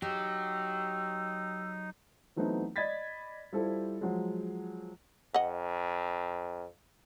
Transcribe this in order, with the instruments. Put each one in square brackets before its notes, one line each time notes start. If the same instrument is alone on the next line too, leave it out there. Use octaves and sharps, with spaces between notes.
[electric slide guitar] F#3 [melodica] D#4 [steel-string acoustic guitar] G4 [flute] E6
[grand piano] E3 F#3 A3 B3 C4 D#4
D5 D#5 B5 G#6 A6 B6
G3 E4 F4 A4 C5
F3 F#3 G#3
[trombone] F2 [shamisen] D#5 F#5